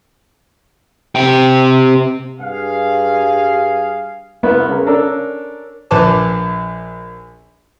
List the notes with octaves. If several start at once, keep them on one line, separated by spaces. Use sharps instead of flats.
C3 G5
G2 G#4 F5
C2 A#3 B3 E5
C#3 A#4
C#4 D4 A4 A#4
A#1 B4 A5 D6